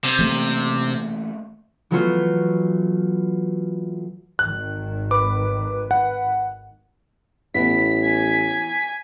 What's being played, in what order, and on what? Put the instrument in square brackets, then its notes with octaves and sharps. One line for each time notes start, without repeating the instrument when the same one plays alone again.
[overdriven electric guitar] C3
[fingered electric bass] E3 A3 A#3
[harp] E3 F#3 A3 B3 F4 F#4
[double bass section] G#1 D#3 [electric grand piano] F#6
[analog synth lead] B4 [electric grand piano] D6
[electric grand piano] F#5
[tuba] A1 [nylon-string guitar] E3 B3 E4 [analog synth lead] B6
[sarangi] G#5